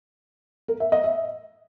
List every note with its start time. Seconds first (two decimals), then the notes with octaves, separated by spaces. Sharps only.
0.68 A#4
0.80 E5
0.92 D#5
1.04 E5